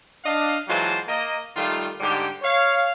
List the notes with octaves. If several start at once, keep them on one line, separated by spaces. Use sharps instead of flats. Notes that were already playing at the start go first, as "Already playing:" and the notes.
D4 D#5 F5
E3 F#3 G#3 F4 C5 A5
A#3 D#5
D#3 G3 A3 F4
G#2 D3 G3 G4
C#5 F5